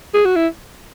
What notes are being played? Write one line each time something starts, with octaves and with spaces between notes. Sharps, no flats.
G#4
F#4
E4